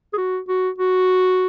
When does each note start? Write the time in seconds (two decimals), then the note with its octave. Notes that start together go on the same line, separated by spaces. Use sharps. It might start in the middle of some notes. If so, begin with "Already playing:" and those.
0.13 G#4
0.18 F#4
0.48 F#4
0.78 F#4